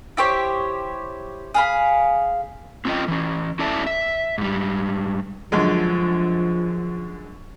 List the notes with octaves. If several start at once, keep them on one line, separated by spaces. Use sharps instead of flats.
E4 G4 C5 C#5
G#4 F5 B5
C4 C#4 F4 A4 D#5 G5
E3 C#4
C#4 E4 A4 D5 E5 A5
E5
G#2 G3
F#2 D3 F3 G#3